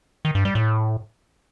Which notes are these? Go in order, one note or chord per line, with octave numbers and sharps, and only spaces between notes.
D#3
G2
G3
A2